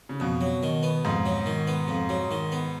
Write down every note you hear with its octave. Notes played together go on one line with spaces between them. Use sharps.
C#3
F2 B2
F#3
D#3
B3
F2 G#2
F#3
D#3
B3
F2
F#3
D#3
B3